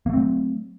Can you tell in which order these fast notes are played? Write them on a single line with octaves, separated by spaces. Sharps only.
A#3 A3 C4 F#3